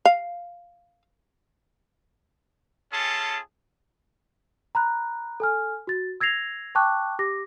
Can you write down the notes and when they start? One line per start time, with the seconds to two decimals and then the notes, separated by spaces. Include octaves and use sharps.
0.05 F5
2.92 C#4 F4 G#4 A4 A5
4.75 A#5 B5 F#6
5.40 A4 G#5 F6
5.87 F#4 A6
6.21 E6 G#6 A#6 C7 F7
6.75 G5 A5 C#6 D6 F#6
7.19 G4 D6 A#6